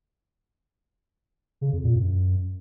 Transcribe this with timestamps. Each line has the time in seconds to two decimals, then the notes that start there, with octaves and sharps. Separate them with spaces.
1.61 C#3
1.73 F2
1.84 A#2
1.95 F#2